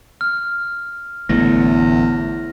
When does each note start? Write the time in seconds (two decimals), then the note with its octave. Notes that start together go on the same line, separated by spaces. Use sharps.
0.21 F6
1.29 A1 E2 D3 A3 A#6